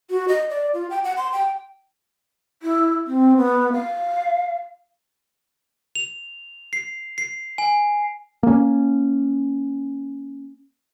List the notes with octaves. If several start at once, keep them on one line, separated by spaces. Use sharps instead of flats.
F#4
D#5
D5
F4
G5
F#5
C6
G5
E4
C4
B3
F5
F7
C7
C7
G#5
A#3 C#4